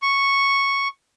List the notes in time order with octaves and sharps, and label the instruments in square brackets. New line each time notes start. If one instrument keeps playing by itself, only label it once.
[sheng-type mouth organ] C#6